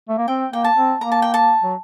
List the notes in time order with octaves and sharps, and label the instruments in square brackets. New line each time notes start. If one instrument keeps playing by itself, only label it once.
[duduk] A3
A#3
[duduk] C4 [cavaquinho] G5
[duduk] A#3 [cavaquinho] G5
[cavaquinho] A5
[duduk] C4
[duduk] A#3 [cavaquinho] A#5
[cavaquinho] A5
G5
A5
[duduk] F#3